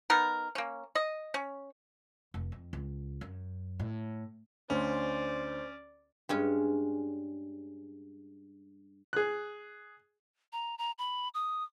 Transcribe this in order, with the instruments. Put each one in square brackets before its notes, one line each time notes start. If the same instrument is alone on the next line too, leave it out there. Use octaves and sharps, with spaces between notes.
[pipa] B3 D#4 A#4
A#3 C#4
D#5
C#4
[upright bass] F1
F2
C#2
F#2
A2
[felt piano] D2 [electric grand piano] C#4 [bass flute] C5 [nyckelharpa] D5
[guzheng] G2 G#3 C#4
[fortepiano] G#4 F#6
[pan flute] A#5
A#5
B5
D#6